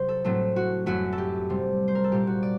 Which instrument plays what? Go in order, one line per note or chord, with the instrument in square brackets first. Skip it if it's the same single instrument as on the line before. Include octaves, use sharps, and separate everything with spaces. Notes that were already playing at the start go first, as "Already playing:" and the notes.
Already playing: [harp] C3 F#3 C5
A4
A2 F#3 A3 C4 A4
F#4
F#2 F#3 A3 F#4
A4
G4
C3 G3 C4
C5
A#4
A4
A#2 G3 C4 G4
F#4
D5